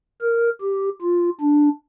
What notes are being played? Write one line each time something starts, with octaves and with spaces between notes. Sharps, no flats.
A#4
G4
F4
D4